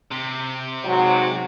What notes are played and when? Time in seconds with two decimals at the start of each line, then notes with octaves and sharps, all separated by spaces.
0.11 C3
0.85 G#2 F#3